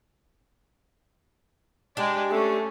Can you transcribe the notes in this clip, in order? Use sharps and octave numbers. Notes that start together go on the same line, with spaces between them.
G#3 D4 G4 D5
A3 C#4